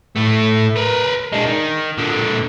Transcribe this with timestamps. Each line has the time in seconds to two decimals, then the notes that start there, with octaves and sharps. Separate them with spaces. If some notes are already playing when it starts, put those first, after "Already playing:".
0.17 A2 A3
0.77 A#4 B4
1.32 G#3 D4
1.45 D#3
1.98 A#2 D3